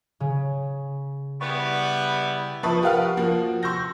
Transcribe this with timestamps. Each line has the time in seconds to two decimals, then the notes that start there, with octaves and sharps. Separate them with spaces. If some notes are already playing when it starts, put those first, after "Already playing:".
0.20 C#3
1.41 G3 B3 E4 C#6
2.63 F3 B4 E5 A5 C#6 D#6
2.82 G4 A#4 B4 F5 F#5 F6
3.17 F3 A#3 F#4
3.63 C6 C#6 E6 G6 A#6